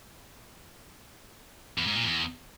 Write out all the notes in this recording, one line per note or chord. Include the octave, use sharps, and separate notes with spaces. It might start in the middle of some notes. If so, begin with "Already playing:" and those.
E2
G#2
A#2
E2